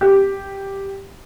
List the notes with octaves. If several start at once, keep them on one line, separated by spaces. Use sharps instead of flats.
G4